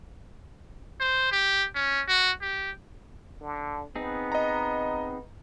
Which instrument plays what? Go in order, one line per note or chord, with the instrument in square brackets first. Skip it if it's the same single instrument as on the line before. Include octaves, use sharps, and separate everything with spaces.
[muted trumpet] C5
G4
C#4
F#4
G4
[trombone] D3
[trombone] B3 [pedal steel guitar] C4 D#4 G#4
[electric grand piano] D#5 A#5